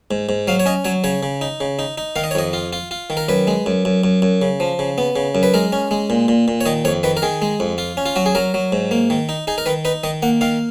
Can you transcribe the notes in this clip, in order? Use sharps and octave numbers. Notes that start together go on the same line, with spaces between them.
G#2
G#2
F#3 F5
C#5
C#4 D#5
F#3 C#5
C#3 C#5
C#3
D#4
C#3
D#4
D#4
D#3 F5
D#5
C#5
F2 D#5
F4
F4
F4
D#3
A#4
F#2 B4
G#3
F#2
F#2
F#2
F#2
C#3
F3
C#3
B3
C#3
F#2
B4
G#3 A#4
C#4
G#3
A#2
A#2
A#2
C#5
D#3 D#5
F2 C#5
D#3 B4
A#4
D#3 G#4
G#3
F2
F4
C#4
F4
F#3 F#4
G#4
F#3 A#4
F#3
G#2
A#3
D#3
D#4
D#4 G#4
A#4
D#3 B4
D#4 B4
D#3 D#5
A#3 F#5
D#3 F5